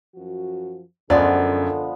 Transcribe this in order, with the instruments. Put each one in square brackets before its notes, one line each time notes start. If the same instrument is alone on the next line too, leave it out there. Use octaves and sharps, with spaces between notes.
[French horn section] F#2 F3 F#4
[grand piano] F#2 [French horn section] D3 A4 [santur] F3 G#3 B3 [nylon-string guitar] D5